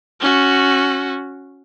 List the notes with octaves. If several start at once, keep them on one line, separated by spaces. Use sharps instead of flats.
C#4 F#4